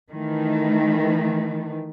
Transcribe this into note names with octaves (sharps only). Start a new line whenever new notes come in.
D#3 E3 A3